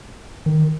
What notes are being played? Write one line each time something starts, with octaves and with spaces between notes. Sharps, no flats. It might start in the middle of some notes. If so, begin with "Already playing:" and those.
D#3